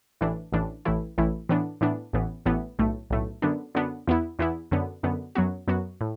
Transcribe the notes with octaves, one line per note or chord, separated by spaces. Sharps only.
A1 A2 E3 D4
A1 A2 E3 D4
A1 A2 E3 A3 E4
A1 A2 E3 A3 E4
A2 E3 B3 D4
A2 E3 B3 D4
A1 A2 E3 B3
A1 A2 E3 B3
B1 A2 A3
B1 A2 A3
F#2 D3 B3 D4
F#2 D3 B3 D4
E2 E3 B3 E4
E2 E3 B3 E4
F#2 D3 B3
F#2 D3 B3
F#2 F#3 B3 F#4
F#2 F#3 B3 F#4
A2